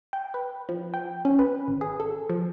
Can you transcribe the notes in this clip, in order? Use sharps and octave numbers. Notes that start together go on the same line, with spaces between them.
G5
B4
F3
G5
C#4
B4
G#1
G#4
A4
F3